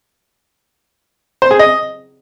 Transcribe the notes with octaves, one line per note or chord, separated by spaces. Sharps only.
C5
G#4
D#5